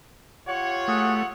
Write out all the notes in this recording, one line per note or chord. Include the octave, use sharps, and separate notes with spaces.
F4 G4 C#5 F#5
A3 F#4 G#4